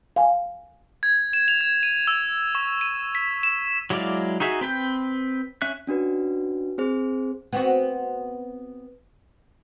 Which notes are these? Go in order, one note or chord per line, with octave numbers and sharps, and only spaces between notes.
F5 G#5
G#6
E7
F7
G#6
D#7
E6
C#6
D#7
B6
E7
F#3 G#3 E4 D5 F5
D#4 F#4 G#4 E5
C4 B4 G5 G6
C#4 E5 F#6
C#4 D4 F#4 B4
C4 G#4 C5
B3 C4 F#4